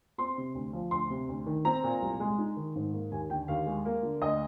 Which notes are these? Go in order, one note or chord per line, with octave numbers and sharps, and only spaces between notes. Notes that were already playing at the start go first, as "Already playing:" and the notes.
C4 C6
C3
D2
F3
D2 C6
C3
D2
D#3
C4 A#5
A#2
C2
G#3
D#4
D#3
G#2
A#3
D#2 G#5
D3 G5
D#2 F5
G#3
A#3
D3
D2 D#5